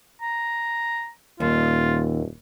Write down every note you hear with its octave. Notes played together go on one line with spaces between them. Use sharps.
A#5
D#1 D#2 F4